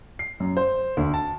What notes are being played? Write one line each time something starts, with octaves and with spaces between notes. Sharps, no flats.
C7
F#2
C5
D2
A5